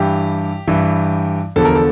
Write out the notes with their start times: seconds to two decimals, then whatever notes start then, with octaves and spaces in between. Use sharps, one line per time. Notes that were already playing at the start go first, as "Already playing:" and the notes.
Already playing: G2 E3 G4
0.68 G2 E3
1.56 E2 D3 F3 A4
1.65 A#4
1.75 A4